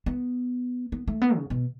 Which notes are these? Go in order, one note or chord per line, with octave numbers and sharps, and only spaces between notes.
B3
B3
A3
B3
C#3
B2